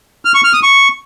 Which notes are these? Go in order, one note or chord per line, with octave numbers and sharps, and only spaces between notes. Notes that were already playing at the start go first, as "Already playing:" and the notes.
F6
C#6
F6
D#6
C#6